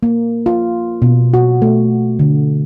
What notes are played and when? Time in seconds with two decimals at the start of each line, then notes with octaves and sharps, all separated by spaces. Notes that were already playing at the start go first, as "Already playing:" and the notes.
0.03 A#3
0.46 F4
1.02 B2
1.34 F#4
1.62 A3
2.19 D3